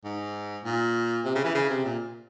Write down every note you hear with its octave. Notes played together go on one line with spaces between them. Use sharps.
G#2
A#2
C3
C#3
E3
C#3
C3
A#2